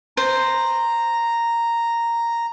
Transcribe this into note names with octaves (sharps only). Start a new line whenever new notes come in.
C5 A#5